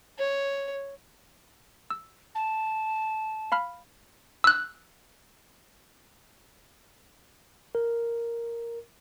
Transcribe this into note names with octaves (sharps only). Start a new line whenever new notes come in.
C#5
E6
A5
F5 B5 F6
E6 F#6
A#4